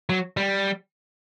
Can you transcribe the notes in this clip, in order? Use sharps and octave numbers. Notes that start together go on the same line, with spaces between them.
F#3
G3